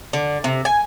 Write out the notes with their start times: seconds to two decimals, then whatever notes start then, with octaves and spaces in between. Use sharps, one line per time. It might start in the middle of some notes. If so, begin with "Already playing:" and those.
0.13 D3
0.44 C3
0.65 G#5